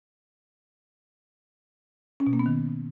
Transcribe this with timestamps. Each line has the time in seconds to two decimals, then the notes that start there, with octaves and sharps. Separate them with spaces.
2.20 C#4
2.27 B2
2.33 A#3
2.39 B3
2.46 D#3